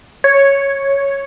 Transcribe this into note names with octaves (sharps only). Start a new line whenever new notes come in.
C#5